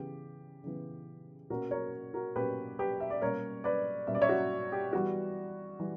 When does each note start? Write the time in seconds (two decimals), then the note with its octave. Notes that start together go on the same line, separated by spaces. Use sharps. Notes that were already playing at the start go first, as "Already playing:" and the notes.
Already playing: C#3 E3 B3 G4
0.64 C#3 E3 B3
1.50 B2 A#3 C#4 F#4 A#4
1.71 A#4 C#5
2.14 F#4 A#4
2.36 B2 A#3 C#4 G4 B4
2.79 G4 B4
3.00 E5
3.10 D5
3.22 B2 G3 A#3 C#4 A#4 C#5
3.64 B4 D5
4.07 B2 G3 A#3 C#4 E5
4.15 D5
4.22 C#5 E5
4.29 F#4
4.72 G4
4.93 E3 G3 B3 F#4
5.80 E3 G3